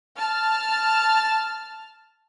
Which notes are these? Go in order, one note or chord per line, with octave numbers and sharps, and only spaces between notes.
A5 F6